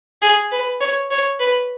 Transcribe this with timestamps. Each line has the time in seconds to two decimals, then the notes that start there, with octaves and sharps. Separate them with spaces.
0.22 G#4
0.52 B4
0.81 C#5
1.11 C#5
1.40 B4